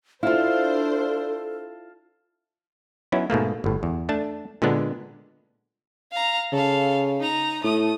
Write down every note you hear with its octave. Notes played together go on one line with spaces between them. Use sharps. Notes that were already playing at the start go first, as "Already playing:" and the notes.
D4 E4 F4 A4 C5 F5 A5
F#3 B3 C#4 D#4 E4
G#2 B2 A3 A#3
G1 A2
E2
A3 D4 A5
A#2 D3 G#3 B3 D4
F5 A#5
C#3 A4 F5
D#4 A#5
A2 A3 D#6